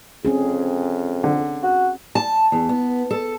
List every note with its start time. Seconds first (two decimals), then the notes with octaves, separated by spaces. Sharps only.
0.25 F2 C4 C#4 G#4
1.24 D3
1.63 F#4
2.15 A5
2.52 E2
2.69 B3
3.11 A4